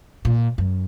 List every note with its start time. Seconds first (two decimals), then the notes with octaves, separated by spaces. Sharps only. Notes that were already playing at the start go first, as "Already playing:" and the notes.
0.25 A#2
0.58 F#2